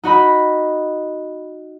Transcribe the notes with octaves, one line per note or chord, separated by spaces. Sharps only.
D#4 F#4 D#5 B5